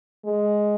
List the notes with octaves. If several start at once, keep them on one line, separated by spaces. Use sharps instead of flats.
G#3